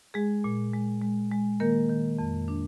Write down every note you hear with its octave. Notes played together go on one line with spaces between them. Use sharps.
G#3 G#4
A#2
G#3
G#3
G#3
D#3 A#3 A#4
D#3
F2
D4